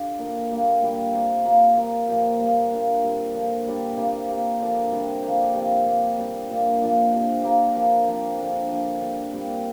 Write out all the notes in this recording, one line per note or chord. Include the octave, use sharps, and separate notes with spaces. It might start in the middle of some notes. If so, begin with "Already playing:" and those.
Already playing: D3 F4 G4 C5
A#2 A#3 D4 A#4
G3 A#3 D4
A#2 G3 A#3
C3 A#3 F4 C5
A#3 F4 A#4
A#3 F4 A#4
A#2 F3 A#3 G4
G3 A#3 F4
A#3 D4 F4
A#2 G3 C4
D3 F3 A#3
A#2 G3 D4
C3 A#3 F4 C5
A#3 G4 A#4
D3 F3 D4 A#4
C3 G3 D4
D3 F3 A#3 G4
C3 F3 C4 F4
C3 A#3 F4
A#2 G3 D4 G4
A#2 A#3 D4
A#2 F3 D4 F4
C3 F3 D4
A#3 G4 A#4
F3 D4 A#4
F3 C4 F4 A#4
D3 A#3 D4 A#4
F3 A#3 D4 G4
D3 G3 D4
A#2 G3 C4